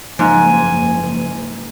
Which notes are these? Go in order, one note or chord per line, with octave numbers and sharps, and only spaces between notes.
F#1 G#2 F3 A#3 G#5